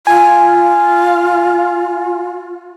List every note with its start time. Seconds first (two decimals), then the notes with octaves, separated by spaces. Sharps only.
0.07 F4 G#5